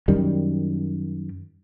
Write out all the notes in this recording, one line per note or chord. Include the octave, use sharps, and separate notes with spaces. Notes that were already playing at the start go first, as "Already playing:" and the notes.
F#2 D#3 G3